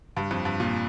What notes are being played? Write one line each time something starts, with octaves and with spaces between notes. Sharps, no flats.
G2
F2
G2
A#2